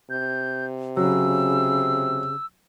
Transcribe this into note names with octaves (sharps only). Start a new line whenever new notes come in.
C3 G6
C#3 F#3 E6